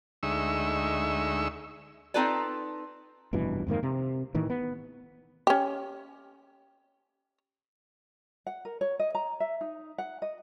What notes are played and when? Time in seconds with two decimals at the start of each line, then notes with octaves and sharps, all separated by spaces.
0.23 D2 G#3 D#4 E5 C#6 E6
2.14 C4 D#4 F4 A4 B4 D5
3.33 F1 G2 B2 E3
3.67 F2 G#2 D#3 A#3
3.83 C3
4.35 A2 D#3 E3
4.50 B3
5.47 C#4 G4
8.47 F#5
8.65 A#4
8.81 C#5
8.99 D#5
9.15 A#5
9.40 E5
9.61 D#4
9.98 F#5
10.22 D#5